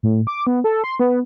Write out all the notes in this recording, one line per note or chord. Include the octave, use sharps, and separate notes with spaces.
A2
D6
B3
A4
C6
B3